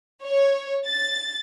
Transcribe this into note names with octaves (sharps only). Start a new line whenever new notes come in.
C#5
A6